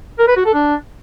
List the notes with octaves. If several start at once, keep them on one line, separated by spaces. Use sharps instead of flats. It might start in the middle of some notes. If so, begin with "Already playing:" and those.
A#4
B4
F#4
A4
D4